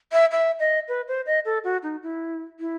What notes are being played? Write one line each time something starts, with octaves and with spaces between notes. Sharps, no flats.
E5
E5
D#5
B4
C5
D#5
A4
F#4
D#4
E4
E4